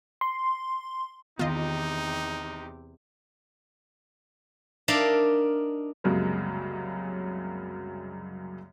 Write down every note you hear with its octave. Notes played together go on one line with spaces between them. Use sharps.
C6
E2 C3 D#3 B3 D#4 F4 G4 D#5
D4 D#4 A#4 D5 E5 F5
C2 F#2 C#3 F#3 G#3 A#3